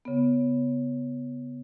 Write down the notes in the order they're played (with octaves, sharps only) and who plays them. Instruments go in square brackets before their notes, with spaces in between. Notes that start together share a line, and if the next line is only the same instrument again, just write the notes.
[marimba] C#3 B3